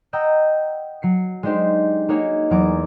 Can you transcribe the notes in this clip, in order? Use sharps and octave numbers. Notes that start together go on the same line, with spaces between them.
D#5 F#5 G5 A#5 D#6 E6
F#3 C7 C#7
G#3 D4 D#4 G4 C5
A#3 D#4 F#4 G#4 C#5 G#5
E2 F#3 B3 A#5 D6 G#6